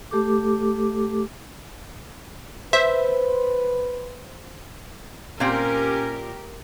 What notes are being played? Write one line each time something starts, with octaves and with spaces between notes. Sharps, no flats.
A3 G4 A4 D6
B4 C5 E5
A#2 C4 C#4 G4 A#4